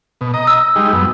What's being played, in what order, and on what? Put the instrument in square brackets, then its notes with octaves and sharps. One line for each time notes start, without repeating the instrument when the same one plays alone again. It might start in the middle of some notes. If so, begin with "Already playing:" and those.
[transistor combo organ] B2
D#5 A#5
[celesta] E6
[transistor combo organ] G3 G#3 D#4
F#2 B3